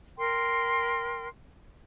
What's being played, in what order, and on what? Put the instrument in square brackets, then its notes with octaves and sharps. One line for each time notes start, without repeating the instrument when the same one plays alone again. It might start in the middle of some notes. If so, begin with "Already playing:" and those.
[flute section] A#4 G5 C6